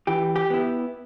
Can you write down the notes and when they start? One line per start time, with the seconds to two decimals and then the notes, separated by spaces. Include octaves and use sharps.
0.07 E3 G4
0.36 G4
0.50 B3 E4